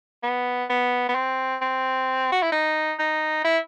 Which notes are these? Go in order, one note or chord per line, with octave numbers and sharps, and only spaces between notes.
B3
B3
B3
C4
C4
F#4
E4
D#4
D#4
E4